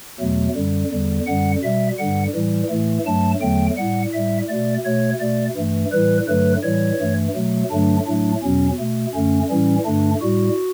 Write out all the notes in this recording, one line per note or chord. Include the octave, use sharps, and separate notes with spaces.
E2 B2 F#3 A3
F#2 D3 G3
E2 D3 G3
F#2 D3 G3 F#5
B2 G3 E5
G2 D3 G3 F#5
A2 E3 G3
A2 E3 A3
G2 F#3 A3 A5
E2 D3 F#3 A3 G5
A2 G3 F#5
A2 G3 E5
B2 A3 D5
B2 A3 C#5
B2 A3 D5
G2 E3 A3
A2 E3 G3 B4
G2 D3 F#3 A3 B4
A2 E3 G3 C#5
G2 E3 A3
B2 F#3 A3
G2 D3 F#3 A3 D4
A2 F#3 A3 D4
E2 B2 F#3 C#4
B2 A3
F#2 D3 A3 C#4
A2 E3 G3 C#4
G2 D3 A3 D4
A2 G3 F#4